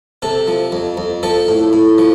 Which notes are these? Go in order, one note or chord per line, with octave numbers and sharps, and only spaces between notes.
C3 A4
F3
F2
F2
F3 A4
A2
A2
F3